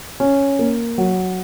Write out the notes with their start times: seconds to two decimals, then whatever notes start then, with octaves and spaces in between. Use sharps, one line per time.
0.20 C#4
0.59 A#3
0.98 F#3